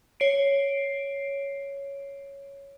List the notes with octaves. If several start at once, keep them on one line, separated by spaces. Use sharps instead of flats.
C#5 C7 D7